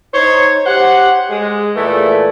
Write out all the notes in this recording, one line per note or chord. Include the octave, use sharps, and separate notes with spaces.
D#4 C5 C#5
G4 C5 F#5
G#3
A#2 E3 A3